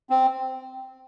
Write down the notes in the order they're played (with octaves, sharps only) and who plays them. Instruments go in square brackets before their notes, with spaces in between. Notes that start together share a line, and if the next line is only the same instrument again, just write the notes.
[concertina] C4